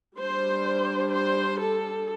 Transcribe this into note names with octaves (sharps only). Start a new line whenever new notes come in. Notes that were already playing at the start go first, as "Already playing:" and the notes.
G3 D4 C5
C5
A4